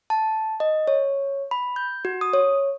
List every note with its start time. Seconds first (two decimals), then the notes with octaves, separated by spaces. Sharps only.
0.10 A5
0.60 D#5
0.88 C#5
1.51 B5
1.76 G6
2.05 F#4
2.21 D#6
2.33 C#5